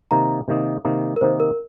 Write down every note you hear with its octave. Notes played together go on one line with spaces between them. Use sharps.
C3 D#3 A#3 D#4 A#5
C3 D#3 A#3 D#4
C3 D#3 A#3 D#4
A#4
C3 D#3 A#3 D#4 C5
A#4